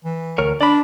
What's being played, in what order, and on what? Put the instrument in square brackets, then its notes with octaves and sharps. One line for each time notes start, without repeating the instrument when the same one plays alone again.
[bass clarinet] E3
[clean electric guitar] D2 A#4 C#5
[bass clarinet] D4 [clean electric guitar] D5 B5